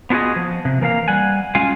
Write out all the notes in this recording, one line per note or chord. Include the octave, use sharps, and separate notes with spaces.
B3 D4 F4 F#4 G#4 D#5
F3
C3
E3 A#3 A#4 F5 A#5
G3 F#5 G#5
G#3 C#4 F4 F5 G#5